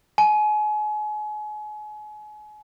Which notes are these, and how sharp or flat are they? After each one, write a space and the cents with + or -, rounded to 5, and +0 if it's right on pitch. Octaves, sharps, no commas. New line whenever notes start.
G#5 +35